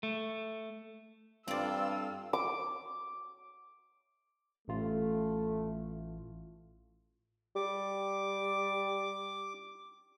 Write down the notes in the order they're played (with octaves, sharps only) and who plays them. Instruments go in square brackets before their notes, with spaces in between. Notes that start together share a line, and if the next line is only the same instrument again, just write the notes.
[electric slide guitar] A3
[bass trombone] G2 [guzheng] C4 D5 [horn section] F4 A4 [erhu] E6
[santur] D6
[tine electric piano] A1 F4 [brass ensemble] A3
[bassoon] G3 [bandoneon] D6